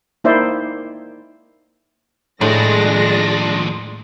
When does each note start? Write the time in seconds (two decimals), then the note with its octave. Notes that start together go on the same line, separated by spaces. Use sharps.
0.24 A#3 D#4 E4 C5 D5 E5
2.41 D#2 A2 F3 G#3 D4 A#6